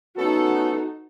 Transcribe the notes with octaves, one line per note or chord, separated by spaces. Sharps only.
A3 B3 C#4 D#4 F#4 A4